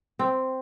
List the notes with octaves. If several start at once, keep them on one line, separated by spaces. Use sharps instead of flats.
C4